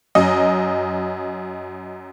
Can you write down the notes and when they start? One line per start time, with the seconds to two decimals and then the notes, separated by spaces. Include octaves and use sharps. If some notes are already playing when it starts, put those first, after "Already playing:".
0.15 F#2 D#5